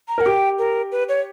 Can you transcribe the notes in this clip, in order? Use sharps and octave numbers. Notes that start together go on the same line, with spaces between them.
A#5
A#4 F#5
G4 G5
A#4
B4
C#5